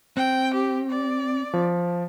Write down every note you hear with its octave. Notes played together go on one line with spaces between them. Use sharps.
C4 G5
G4
D5
F3